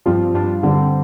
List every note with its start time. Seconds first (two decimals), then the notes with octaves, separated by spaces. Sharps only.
0.06 G2 F3 G3 C4 F4
0.34 G2 G3 D4 F4
0.63 G2 D3 G3 C4